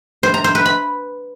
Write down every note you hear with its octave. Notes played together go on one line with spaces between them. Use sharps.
C5
A#5
C5
B4
B5